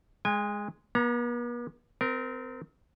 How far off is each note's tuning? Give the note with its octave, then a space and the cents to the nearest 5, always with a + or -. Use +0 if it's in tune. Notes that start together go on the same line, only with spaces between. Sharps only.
G#3 +0 G#5 -35
B3 -45 A#5 +15
C4 -30 A#4 +0